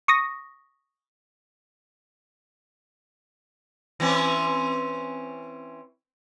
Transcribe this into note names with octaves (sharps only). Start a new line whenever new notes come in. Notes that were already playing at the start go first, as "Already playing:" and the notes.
C#6 D#6 A#6
E3 C4 C#4